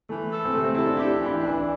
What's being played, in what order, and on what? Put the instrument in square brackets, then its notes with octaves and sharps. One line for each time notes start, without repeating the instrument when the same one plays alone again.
[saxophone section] E3 [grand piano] A3
[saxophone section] A4
[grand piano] C4
[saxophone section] C3 [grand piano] A3
[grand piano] C4
[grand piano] E4 [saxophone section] A4
[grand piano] D4
[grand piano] E4 [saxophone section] G4
[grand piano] D4
[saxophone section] E3
[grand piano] E4
[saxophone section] E3 [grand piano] D4